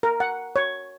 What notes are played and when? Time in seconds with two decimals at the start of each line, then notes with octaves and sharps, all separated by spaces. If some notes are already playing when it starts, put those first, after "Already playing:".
0.03 A#4
0.20 F#5
0.56 C#5